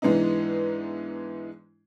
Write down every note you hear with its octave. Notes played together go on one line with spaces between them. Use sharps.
G#2 E3 G#3 B3 D4 D#4